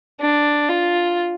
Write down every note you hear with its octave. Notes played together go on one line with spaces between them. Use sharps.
D4
F4